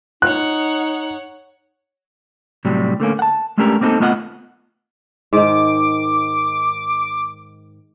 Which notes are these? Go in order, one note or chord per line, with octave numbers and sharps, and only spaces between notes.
D#4 C#5 F#5 F#6
A2 C3 F#3 G3
D3 A3 A#3 C#4
F#5 A5
G#3 A3 C#4 D4 G4 A#4
A#3 C4 D#4 G#4 A4
A3 B3 F4 D#5 E5 F#5
G#2 D#3 D6